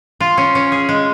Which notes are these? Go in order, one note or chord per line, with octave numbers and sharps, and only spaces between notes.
F4
C#4
C#4
G#4
G#3